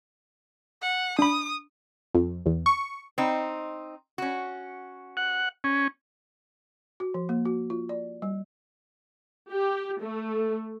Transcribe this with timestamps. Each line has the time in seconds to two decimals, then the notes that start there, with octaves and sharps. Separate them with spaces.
0.82 F#5
1.19 D4 B5 D#6
2.14 F2
2.46 E2
2.66 C#6
3.18 C4 D#4
4.18 C#4 F#4
5.17 F#5
5.64 C#4
7.00 F#4
7.14 F3
7.29 A#3
7.45 F#4
7.70 F4
7.89 D5
8.22 G3
9.51 G4
10.02 A3